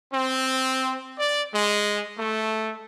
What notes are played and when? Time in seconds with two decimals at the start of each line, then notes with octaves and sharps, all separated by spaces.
0.13 C4
1.18 D5
1.54 G#3
2.17 A3